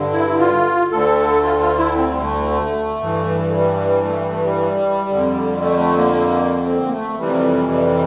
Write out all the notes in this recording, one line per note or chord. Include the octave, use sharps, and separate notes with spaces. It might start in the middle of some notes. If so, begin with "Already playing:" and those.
Already playing: G2 D3
E4
F4
D2 D3 A4
F4
F4
E4
C4
G3
A3
G2 E3
A3
G3
A3
G3
A3
G3
D3
F2
A3
A3
A#3
C4
A#3
A3
F2 C3 E3 G3
G3